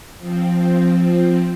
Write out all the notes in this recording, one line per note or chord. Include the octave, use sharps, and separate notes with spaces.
F3 C4